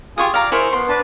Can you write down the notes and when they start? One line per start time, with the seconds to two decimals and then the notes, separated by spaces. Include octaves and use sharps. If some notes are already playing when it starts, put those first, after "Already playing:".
0.18 F4 G4 G#4 G#5 C#6 D#6
0.34 D5 F5 A#5 D6
0.52 E4 G#4 A#4 C5 C#6
0.73 B3 C6
0.89 D4 B4 A5